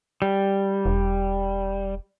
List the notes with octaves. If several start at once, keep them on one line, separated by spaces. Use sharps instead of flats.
G3
E1